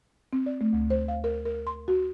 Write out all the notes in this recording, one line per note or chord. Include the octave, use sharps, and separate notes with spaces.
C4
D5
A3
D2
C5
F5
A#4
A#4
C6
F#4